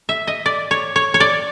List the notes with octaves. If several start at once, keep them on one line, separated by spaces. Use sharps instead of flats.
E5
D#5
D5
C#5
C#5
C#5
D5